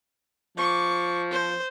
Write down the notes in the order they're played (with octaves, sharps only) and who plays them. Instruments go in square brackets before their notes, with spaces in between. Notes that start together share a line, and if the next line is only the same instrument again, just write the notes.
[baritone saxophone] F3 [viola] C#6 D6
[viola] C5